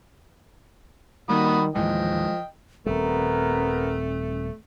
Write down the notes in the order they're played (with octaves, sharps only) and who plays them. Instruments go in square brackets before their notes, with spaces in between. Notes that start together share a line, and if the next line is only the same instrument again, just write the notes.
[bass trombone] D#3 [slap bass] G3 [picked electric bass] A#3 [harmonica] F#4 B5 D#6
[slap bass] D#2 A2 E3 [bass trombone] F3 [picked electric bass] G#3 [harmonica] D#5 G5
[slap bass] D#1 C#2 G3 [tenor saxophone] A3 [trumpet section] B3 A#4 [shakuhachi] C4